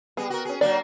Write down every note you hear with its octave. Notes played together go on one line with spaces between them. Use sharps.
G3 B3 G#4
F#4 A#4
C#4 G#4
F#3 A#3 D4 D5